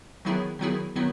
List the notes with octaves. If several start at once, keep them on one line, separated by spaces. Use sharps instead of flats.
D#3 F#3 B3 E4 G#4
D#3 F#3 B3 E4 G#4
D#3 F#3 B3 E4